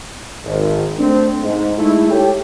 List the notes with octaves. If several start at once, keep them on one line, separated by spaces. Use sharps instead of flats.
G#1
A3 C4 D4
G#2
G#3 A3 D#4 E4
G4 A4 C#5 G5